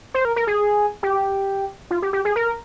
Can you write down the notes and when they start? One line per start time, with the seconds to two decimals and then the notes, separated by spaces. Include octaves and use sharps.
0.14 C5
0.25 A#4
0.36 A#4
0.47 G#4
1.03 G4
1.91 F4
2.02 G4
2.13 G4
2.25 G#4
2.36 A#4